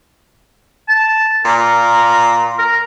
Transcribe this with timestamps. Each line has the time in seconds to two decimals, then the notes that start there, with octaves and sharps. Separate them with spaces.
0.89 A5
1.45 A#2 A#4
2.58 A#4